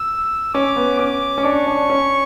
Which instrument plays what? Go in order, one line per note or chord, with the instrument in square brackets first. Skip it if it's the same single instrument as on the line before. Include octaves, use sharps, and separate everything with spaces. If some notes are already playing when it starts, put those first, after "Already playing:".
Already playing: [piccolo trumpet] E6
[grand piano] C#4 [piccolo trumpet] D6
[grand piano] B3
[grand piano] C#4 [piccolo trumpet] D6
[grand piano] C#4
[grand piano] D4 [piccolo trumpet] C#6
[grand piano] D4
C#4